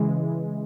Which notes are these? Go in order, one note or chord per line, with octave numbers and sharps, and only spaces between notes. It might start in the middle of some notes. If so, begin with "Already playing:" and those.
Already playing: C#3 E3 G#3